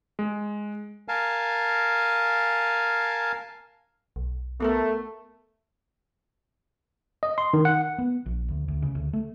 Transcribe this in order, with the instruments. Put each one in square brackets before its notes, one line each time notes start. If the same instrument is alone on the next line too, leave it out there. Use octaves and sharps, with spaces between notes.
[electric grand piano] G#3
[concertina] A#4 F5 G#5 A5
[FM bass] B1
[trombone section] A3 [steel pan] B3 A4 A#4
[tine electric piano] D#5
C6
D#3
F#5
[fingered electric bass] B3
A#1
D2
D2
C#3
D2
A3